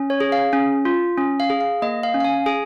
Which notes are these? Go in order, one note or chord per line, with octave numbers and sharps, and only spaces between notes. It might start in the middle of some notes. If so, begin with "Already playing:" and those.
Already playing: C#4
C#5
G#4
F5
C#4
F4
C#4
F5
G#4
F5
A#3 D#5
F5
C#4
F5
G#5
G#4 G#5